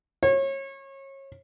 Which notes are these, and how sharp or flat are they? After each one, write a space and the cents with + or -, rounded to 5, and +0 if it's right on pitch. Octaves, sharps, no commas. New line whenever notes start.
C#5 -30